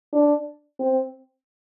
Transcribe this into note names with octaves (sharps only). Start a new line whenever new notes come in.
D4
C4